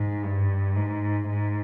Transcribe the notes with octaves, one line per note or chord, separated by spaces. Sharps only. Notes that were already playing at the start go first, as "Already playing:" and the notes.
Already playing: G#2
G2
G#2
G#2